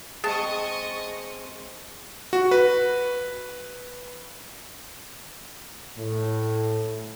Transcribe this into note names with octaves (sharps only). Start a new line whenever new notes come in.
G#3 C4 G#4 D#5 A5 C#6
F#4
B4
A2